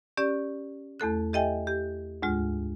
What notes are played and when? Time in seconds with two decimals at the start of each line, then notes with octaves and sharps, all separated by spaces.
0.17 C#4 G4 D5
1.00 E2 A3 A4 F#6
1.33 G4 A4 D#5 E5 G5 G#5
1.67 G4
2.22 D2 G#2 G#3 F4